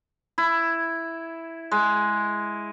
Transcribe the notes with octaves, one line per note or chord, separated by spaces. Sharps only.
E4
G#3